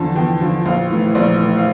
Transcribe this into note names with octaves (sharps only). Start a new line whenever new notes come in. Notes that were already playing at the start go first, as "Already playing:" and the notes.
Already playing: E2 D3 F3 A5
E2 G5
D3 F3
A#1 F5
A2 E3
A#1 D5
A2 E3
F5